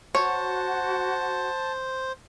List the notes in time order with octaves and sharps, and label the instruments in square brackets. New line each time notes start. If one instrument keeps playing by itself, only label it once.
[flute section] F#4 F#5 [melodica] C5 [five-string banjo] C#5 [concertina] A5